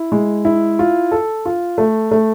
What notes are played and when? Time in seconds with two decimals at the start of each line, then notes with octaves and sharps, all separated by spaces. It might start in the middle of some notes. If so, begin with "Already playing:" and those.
Already playing: E4
0.12 G#3
0.45 E4
0.79 F4
1.11 A4
1.46 F4
1.78 A3
2.11 A3